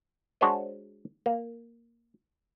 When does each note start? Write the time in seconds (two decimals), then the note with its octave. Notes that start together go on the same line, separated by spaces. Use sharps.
0.41 G#3 D4 F#4 C5 C#5 D#5
1.26 A#3